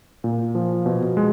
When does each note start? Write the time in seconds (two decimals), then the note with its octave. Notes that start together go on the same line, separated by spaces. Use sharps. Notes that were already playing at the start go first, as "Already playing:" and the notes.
0.24 A#2
0.55 F3
0.86 B2
1.17 G#3